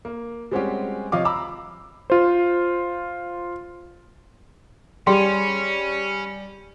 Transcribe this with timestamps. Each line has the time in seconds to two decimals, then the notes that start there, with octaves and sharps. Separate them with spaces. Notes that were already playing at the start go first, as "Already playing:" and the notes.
0.05 A#3
0.51 G3 G#3 C4 C#4 F#4 G4
1.12 C3 F3 C#5 D#5 F5 D6
1.25 A#5 B5 D6 E6
2.10 F4 C5
5.07 G3 C#4 G#4 G5 C6